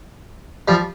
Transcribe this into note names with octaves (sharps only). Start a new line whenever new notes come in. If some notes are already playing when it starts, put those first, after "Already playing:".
F3 G3